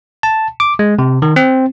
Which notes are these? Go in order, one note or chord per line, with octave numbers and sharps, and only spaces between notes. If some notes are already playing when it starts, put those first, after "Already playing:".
A5
D6
G#3
C3
D#3
C4